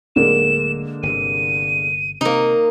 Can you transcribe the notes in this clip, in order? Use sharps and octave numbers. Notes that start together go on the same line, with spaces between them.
D1 D3 G#3 A#3 E7
G1 C3 D#7
C3 A#3 D#4